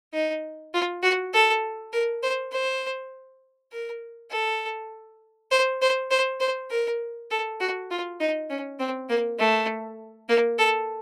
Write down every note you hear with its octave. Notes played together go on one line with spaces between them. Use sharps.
D#4
F4
F#4
A4
A#4
C5
C5
A#4
A4
C5
C5
C5
C5
A#4
A4
F#4
F4
D#4
C#4
C4
A#3
A3
A#3
A4